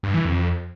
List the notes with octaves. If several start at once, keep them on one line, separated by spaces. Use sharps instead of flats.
G2
E3
F2